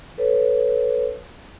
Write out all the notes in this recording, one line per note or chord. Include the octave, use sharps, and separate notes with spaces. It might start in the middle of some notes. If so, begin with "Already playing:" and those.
A4 B4 C#5